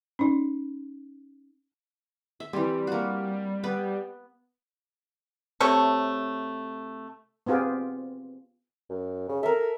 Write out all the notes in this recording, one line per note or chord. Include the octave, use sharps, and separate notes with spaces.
C#4 D#4
E5
E3 G3 C4
A#3 F#4
B3 B4
C3 A3 C#5
B3 C4 F4 G4 G#4
F#2
C#3
A4 A#4 E5